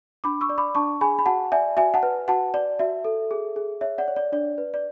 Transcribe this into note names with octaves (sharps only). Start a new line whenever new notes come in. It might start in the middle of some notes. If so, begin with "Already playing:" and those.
D4 B5 D6
C#6 E6
D5
B5 D6
D4 A5 C#6
G#4 G#5 B5
B5
F#4 F#5 A5
D5 E5 G#5
F#4 E5 G#5
F#5 A5
B4
F#4 F#5 A5
D5
F#4 E5
A4
G#4
G#4
C#5 E5
D5 F#5
C#5
D5
D4 D5
B4
D5